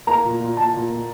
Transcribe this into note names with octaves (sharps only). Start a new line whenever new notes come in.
A#3 A#5
A#2
A#2
A#2 A5
A#2
A#2